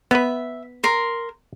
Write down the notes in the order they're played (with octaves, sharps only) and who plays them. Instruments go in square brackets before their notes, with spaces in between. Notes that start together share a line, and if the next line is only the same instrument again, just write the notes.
[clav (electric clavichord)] B3 B4 [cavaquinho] E5
[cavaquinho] A#4 C6